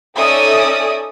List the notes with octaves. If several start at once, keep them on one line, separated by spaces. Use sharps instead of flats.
C#4 D#4 A4 D5 E5 D#6